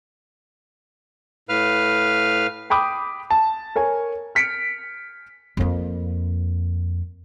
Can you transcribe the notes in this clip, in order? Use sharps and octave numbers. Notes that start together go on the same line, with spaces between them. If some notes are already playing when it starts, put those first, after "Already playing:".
A2 B4 F5 F6
G5 B5 D6 D#6
A5
A#4 C#5 G#5
F6 B6 C#7 D7
F2 A#3